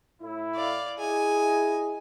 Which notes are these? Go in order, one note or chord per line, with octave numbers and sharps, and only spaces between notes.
A2 E4
D5 F5
E4 G#4 D#5 G#5